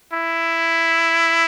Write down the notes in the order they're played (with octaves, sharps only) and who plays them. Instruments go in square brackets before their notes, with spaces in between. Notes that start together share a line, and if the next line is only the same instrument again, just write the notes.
[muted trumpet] E4